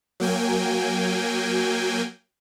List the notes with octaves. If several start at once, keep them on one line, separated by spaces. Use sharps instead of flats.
F#3 A#3 G5 G#5